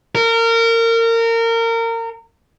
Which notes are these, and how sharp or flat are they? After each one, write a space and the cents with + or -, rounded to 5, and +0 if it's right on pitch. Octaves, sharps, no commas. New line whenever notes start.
A#4 -25